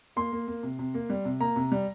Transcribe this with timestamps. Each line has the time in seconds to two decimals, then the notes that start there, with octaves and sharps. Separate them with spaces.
0.16 A#3 C6
0.32 A#3
0.48 A#3
0.63 C3
0.79 C3
0.94 A#3
1.10 G3
1.25 C3
1.41 A#3 A#5
1.56 C3
1.72 G3